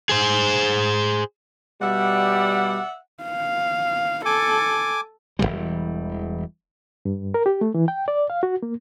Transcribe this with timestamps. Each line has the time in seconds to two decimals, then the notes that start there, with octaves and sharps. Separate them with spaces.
0.09 G#4 C5
1.82 B2 G3 D5 E5 F#5
3.24 F5
4.25 A4 G#5 D6
5.39 E1 E2 E3 G3
7.05 G2
7.34 A#4
7.46 G4
7.61 A3
7.74 E3
7.88 G5
8.08 D5
8.30 F5
8.43 F#4
8.63 A#3